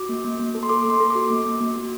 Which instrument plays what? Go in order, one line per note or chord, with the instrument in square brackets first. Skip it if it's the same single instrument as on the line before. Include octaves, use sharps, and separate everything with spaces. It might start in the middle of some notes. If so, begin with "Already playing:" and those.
Already playing: [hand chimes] F#4 D6
A#3
A#3
A#3
A4
C6
A4 D6
A#3 C6
A4
F#4 D6
A#3 D6
A#3
A#3
F#4